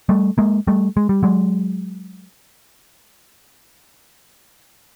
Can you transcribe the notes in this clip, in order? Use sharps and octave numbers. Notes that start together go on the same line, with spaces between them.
G3 A3
G#3 A#3
G3 A3
G#3
G3
F#3 G#3